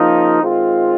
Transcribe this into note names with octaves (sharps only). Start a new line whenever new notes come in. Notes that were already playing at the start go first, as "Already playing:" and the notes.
Already playing: C#3 F3 A#3 D#4
D#3 G#3 C4 F4